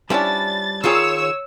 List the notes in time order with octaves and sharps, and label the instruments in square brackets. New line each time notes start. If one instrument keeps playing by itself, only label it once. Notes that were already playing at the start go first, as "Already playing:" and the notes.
[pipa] F3 C#4 D4 [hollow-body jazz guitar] G3 E4 [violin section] A6
[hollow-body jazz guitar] D#3 F4 G#4 [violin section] C#5 E6